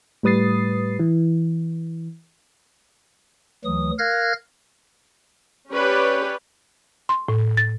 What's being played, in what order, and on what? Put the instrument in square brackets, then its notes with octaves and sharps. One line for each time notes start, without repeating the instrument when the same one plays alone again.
[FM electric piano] A2 G3 B4 D#6 A6 C7
E3
[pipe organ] D2 E3 F#3 D#6
A#4 F5 F6 F#6 G#6 A#6
[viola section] C#4 G4 B4 C#5 D5
[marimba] C6
A2
A6